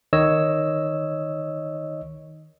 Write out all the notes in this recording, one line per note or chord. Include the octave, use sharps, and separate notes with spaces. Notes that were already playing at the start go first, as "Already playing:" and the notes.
D#3 C#5 D#5 E6